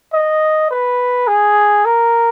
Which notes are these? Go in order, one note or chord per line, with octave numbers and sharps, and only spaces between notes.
D#5
B4
G#4
A#4